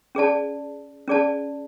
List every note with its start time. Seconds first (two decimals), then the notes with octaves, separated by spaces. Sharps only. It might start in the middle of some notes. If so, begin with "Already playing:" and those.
0.15 C#4 G#4 D5 A5
1.08 C#4 G#4 D5 A5